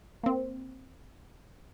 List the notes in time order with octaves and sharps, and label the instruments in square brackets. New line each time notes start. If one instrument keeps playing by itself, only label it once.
[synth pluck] A#3 C4